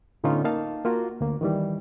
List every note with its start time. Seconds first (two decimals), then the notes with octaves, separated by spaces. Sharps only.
0.24 A2 D3 B3 C#4 D#4 F4
0.44 A#3 D#4 F5 A5
0.85 A#3 F4 F#4
1.21 D2 A#3
1.41 D#3 E3 G3